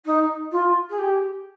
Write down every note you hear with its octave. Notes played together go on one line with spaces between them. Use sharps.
D#4
F4
G#4
G4